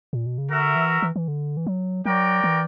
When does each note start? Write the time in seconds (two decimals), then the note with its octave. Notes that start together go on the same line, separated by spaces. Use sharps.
0.13 A#2
0.26 B2
0.38 C#3
0.50 D3 F#4 A#4 E5
0.76 E3
1.02 E3
1.16 E3
1.28 D3
1.57 E3
1.67 F#3
2.05 F#3 F#4 A#4 D5 G5
2.44 E3